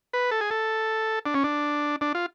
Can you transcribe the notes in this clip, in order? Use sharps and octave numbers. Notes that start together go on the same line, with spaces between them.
B4
A4
G#4
A4
D4
C#4
D4
D4
F4